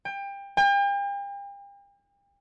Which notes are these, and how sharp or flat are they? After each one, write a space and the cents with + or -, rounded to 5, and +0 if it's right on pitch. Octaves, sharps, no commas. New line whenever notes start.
G5 +25
G5 +40